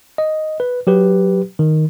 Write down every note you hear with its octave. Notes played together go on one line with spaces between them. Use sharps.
D#5
B4
F#3 G4 B4
D#3